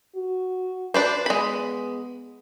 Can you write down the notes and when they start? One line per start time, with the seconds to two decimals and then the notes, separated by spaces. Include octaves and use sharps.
0.15 F#4
0.94 D4 B4 C5
1.26 G#3 B3 B5